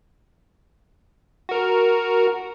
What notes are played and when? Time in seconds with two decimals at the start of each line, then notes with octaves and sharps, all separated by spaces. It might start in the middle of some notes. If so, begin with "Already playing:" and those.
1.49 F#4 A#4